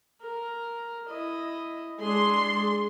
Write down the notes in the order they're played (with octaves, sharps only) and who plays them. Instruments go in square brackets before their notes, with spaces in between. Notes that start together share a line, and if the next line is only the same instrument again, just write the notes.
[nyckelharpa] A#4
E4 D#5
[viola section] G#3 C6 [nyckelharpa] D4 G#4